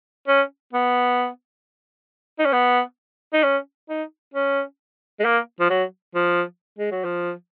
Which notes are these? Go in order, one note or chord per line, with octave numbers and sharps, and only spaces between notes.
C#4
B3
D#4
C#4
B3
D#4
C#4
D#4
C#4
G#3
A#3
F3
F#3
F3
G#3
F#3
F3